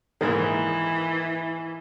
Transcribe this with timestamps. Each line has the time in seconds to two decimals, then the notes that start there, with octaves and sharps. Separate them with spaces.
0.21 A#1 G#2 D#3 E3